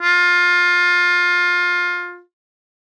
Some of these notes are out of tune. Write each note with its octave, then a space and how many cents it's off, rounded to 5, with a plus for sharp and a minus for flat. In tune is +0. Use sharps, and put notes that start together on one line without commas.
F4 +20